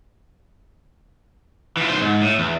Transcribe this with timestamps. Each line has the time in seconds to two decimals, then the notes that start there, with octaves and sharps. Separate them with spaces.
1.77 E3 F4
1.88 B1 C5
2.02 G#2
2.22 A2
2.39 E2